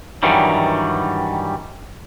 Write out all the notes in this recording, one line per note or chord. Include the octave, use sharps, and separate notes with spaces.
G2 D#3 E3 F#3 G3